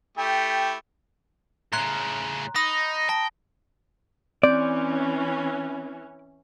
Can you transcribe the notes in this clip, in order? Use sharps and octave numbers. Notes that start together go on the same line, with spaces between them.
A3 E4 G4 G5
A2 C#3 A#5 C6 F#6
D#4 B5 D#6 A#6
G5 A5 A#6
E3 C4 C#4 D5